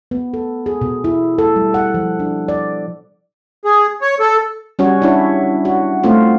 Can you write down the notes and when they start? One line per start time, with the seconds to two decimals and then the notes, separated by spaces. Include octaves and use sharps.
0.11 B3
0.34 A4
0.66 G#4
0.81 B2
1.04 E4
1.38 A4
1.56 G3
1.74 F#5
1.94 F3
2.20 D4
2.48 D5
3.65 G#4
4.01 C#5
4.20 A4
4.79 G3 C#4 F#4 C#5
5.02 D4 E4 C#5
5.65 F#4
6.04 A3 C4 F4